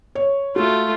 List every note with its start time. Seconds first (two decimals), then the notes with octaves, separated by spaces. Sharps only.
0.15 C#5
0.56 A3 F4 F#4